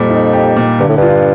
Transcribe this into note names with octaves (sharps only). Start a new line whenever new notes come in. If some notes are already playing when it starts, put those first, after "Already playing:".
Already playing: F2 A#2 G3
D#4
G4
A#2
G2 D3
A2
G2 F4